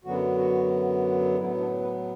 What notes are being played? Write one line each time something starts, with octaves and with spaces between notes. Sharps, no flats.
F#2 D3 F#3 B3 F#4
F#4
A2 F#3 B3 E4
D4
B4